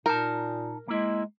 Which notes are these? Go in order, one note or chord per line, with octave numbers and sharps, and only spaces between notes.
A#2 D#4 A#4 A5
G#3 A#3 E4